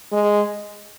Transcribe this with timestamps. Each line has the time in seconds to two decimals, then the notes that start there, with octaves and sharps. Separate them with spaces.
0.12 G#3